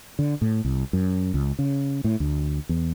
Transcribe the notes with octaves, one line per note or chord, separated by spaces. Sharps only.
D3
A2
C2
F#2
C#2
C#3
A2
D2
E2